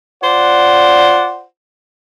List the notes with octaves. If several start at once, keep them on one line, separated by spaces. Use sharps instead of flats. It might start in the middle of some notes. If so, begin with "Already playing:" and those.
F4 C5 D5 F#5